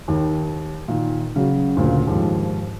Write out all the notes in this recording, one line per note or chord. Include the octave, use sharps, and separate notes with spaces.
D#2 D#3
A#2 D#3
C#3 F#3
D2 A#2 C#3
D#2 G#2 F3